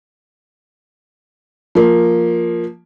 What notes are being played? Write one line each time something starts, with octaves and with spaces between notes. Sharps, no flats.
F3 A#3